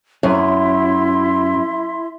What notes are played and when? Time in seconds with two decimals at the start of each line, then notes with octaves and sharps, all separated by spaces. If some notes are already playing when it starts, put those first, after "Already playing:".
0.23 F#2 E4 E5 C6